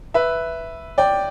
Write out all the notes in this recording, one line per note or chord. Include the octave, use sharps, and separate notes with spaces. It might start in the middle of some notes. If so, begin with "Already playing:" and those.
B4 E5
D5 G5